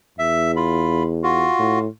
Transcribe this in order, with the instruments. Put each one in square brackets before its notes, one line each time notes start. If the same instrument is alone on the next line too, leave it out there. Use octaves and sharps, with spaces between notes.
[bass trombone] E2 [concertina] E5
[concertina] F4 B5
F4 F#4
[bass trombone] A2